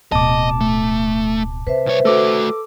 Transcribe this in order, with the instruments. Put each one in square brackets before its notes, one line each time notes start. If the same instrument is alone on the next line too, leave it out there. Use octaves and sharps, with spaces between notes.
[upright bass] D1 B2 [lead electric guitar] D#5 [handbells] A5 D6
[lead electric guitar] A3
[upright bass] C3 [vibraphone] B4 C5 E5
[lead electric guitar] C2 C#5
[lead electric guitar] A3 F#4 [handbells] A4 D6